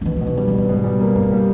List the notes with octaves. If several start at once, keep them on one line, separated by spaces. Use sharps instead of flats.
E3
B2 D#3
E3
B2
D#3
D#3 G3
E3
B2
D#3
G#2 B2
G3
G2 A#3
G2 A#3
G3